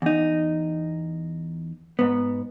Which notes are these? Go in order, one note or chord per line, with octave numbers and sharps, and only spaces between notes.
E2 D#4
G#2 B3